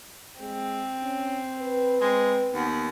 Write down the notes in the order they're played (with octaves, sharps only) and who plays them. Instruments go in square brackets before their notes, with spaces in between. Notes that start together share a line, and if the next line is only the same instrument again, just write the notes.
[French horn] G#3 [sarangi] C4
[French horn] C#4
B4
[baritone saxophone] G#3 [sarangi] C4
[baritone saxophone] D#2 [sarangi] B3